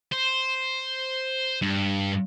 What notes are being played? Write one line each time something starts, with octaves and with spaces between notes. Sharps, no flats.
C5
G2